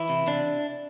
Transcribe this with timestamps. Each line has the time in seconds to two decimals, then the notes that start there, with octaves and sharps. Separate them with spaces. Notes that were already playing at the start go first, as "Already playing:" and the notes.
Already playing: E3 E4
0.09 C3
0.27 C3 D4